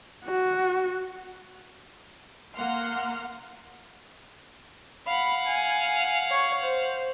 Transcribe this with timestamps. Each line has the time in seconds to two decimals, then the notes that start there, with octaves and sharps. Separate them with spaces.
0.24 F#4
2.55 A#3 F#5 C6 F6
5.07 F5 F#5 B5
5.47 G#5
6.31 C#5
6.64 C5